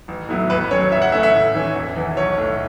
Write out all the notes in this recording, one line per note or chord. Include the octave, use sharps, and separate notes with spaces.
A1
A2 F#3 B3 E4
A1 B4
A2 F#3 A3 C#4 C#5
A1 E5
F#5
A2 A3 C#4 E5
E5
A2
E3 C#4 E4
E1
E2 E3
B1 C#5
A2 E3